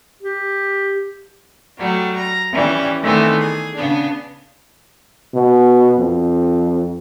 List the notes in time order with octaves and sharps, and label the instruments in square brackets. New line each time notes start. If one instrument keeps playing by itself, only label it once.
[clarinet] G4
[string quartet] F#3 G3 A3
A#5 A#6
E3 G3 C#4
D#3 E3 A3 B3 C4
G#4
C#3 B3 D4
[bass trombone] B2
F2